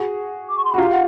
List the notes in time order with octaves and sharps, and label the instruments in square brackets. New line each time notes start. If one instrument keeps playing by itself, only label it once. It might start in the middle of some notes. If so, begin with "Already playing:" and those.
Already playing: [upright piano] F#4 G#4
[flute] D6
C#6
C6
B5
[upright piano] F#4
[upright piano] F4 G4 [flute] A#5
[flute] F#5